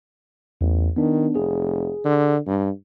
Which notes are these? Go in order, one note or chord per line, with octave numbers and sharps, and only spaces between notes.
A1 E2
D#3 B3 D4
F1 G#4
D3
G2